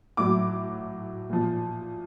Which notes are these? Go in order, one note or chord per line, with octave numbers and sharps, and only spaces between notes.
A2 F#3 D6
A#2 F3